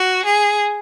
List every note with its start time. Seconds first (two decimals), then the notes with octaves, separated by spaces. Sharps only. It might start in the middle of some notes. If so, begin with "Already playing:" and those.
Already playing: F#4
0.25 G#4